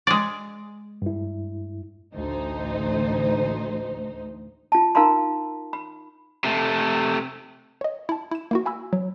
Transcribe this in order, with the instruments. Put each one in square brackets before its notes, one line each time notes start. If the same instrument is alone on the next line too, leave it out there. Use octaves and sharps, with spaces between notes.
[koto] G#3 D5
[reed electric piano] G2 E4
[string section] A1 D2 D#4 C5
[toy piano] F4 A5
D#4 A#4 F5 A5 A#5 C6
B5
[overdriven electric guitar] C3 A3
[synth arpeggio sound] C#5 D#5
E4 A5
E4 E7
A#3 E4 F#4
F5 G#5 B5 E6
F#3